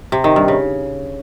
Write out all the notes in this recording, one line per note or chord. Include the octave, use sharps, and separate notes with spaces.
C3
D#3
G2
C#3